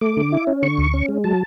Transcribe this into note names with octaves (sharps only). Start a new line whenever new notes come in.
A3 D6
D3
E4
C#4
D3 C#6
D2
C#4
G#3
F#3 A5